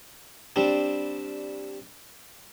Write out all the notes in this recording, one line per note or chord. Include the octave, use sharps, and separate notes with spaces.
G3 C4 D4